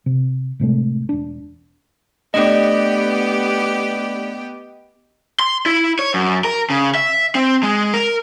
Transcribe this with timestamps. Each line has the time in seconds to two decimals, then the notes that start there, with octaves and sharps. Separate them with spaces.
0.06 C3
0.60 A2 C3 G#3 A3
1.09 E1 D4
2.34 A3 B3 D4 G4 D5 D#5
5.39 C6
5.66 E4
5.99 C#5
6.14 F#2
6.44 A#4
6.70 C#3
6.95 E5
7.35 C4
7.63 G#3
7.94 A#4